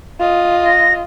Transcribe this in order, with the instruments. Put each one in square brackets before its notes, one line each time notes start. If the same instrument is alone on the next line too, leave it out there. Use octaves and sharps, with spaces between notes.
[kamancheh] F4 D#5
[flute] A#6